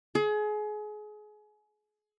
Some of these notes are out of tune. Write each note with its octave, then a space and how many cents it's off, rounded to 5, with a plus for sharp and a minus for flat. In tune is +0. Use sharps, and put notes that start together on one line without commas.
G#4 +30